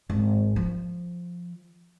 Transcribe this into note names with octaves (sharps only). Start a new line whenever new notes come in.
G#1
F3